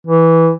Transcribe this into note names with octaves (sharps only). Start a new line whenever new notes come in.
E3